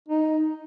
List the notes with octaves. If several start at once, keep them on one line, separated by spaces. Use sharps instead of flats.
D#4